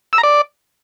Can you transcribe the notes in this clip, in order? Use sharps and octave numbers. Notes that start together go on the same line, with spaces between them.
E6
A#5
D5